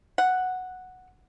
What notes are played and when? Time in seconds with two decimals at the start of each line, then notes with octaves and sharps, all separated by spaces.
0.18 F#5